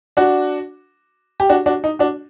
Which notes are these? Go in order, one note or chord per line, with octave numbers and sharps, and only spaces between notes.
D4 F#4
G4
D4 F#4
D4 F#4
D#4
D4 F#4